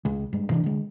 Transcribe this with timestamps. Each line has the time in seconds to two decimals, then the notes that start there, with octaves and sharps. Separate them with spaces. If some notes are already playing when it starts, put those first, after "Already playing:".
0.05 C#2 C#3 G#3
0.33 G2 G#3
0.50 C3 E3 C4 D4
0.64 D3 G#3